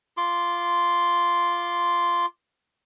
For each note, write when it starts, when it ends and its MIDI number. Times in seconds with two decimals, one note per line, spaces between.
0.17 2.26 65
0.17 2.26 84
0.17 2.26 86